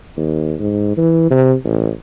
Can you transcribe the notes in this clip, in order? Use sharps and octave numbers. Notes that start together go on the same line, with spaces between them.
D#2
G#2
E3
C3
A1